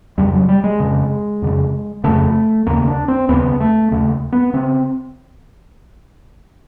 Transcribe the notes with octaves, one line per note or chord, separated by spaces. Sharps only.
F2 C#3 G3
F#3
G3
G#3
F2 C#3
F2 C#3
F2 C#3 A3
D#2 C#3 A#3
D4
C4
D#2 C#3 B3
A3
D#2 C#3 A3
B3
C#3 C4